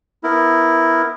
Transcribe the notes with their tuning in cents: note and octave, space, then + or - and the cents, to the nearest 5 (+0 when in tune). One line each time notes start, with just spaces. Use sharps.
B3 +0 E4 +0 A#4 +0